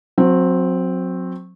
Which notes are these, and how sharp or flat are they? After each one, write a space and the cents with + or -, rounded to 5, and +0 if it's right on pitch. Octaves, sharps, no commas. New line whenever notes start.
F#3 -25 C4 +0